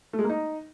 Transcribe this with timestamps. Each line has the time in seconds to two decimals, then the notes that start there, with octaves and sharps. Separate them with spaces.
0.13 A3
0.19 G#3
0.24 A#3
0.29 D#4